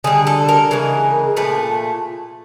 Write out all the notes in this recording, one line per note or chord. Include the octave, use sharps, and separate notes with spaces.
D3 G3 G#4
A4
A#4
C#3 E3 G#3
A#2 F3 A3 B4